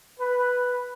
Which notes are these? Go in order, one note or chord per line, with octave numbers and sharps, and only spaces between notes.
B4